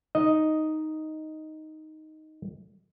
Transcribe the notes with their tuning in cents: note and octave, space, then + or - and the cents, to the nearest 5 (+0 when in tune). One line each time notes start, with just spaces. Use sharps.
D#4 +0 D#5 +0